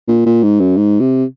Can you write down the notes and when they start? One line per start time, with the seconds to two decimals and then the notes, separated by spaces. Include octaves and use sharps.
0.08 A#2
0.26 A#2
0.43 G#2
0.60 F#2
0.77 G#2
1.00 C3